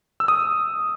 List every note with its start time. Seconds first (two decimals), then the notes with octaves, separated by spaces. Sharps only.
0.20 E6
0.28 D#6